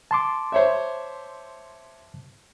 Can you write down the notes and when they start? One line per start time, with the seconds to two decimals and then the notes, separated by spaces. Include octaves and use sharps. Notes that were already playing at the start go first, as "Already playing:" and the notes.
0.11 A5 C6 D6
0.52 C5 C#5 E5